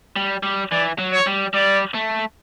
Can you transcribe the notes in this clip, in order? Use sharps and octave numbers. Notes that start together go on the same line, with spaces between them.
G3
G3
E3 D5
F#3
C#5
G3
G3 D5
A3